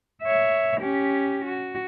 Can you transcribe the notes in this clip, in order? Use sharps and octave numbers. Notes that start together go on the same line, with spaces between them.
C#5 E5
C#4 G4
F#4